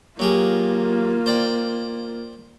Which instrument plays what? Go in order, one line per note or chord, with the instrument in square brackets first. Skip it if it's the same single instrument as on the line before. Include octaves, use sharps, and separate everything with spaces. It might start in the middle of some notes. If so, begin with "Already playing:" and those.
[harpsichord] F#3 G4 G#4 [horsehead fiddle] A#3 F4
[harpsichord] C5 D5 G5